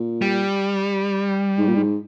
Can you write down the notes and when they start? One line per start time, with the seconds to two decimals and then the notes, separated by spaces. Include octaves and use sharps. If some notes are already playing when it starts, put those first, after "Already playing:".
Already playing: A#2
0.22 G3
1.58 G#2
1.67 A#2
1.76 G#2